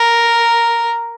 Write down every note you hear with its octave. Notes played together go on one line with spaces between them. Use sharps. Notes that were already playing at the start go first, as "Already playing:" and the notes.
Already playing: A#4